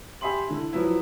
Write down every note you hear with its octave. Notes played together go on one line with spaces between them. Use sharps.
G4 E5 G#5 B5 C6 F#7
D3 E4
F3 F#3 B3 E4